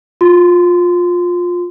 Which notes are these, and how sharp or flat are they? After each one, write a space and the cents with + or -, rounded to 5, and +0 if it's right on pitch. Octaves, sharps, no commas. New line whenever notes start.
F4 +20 C6 -20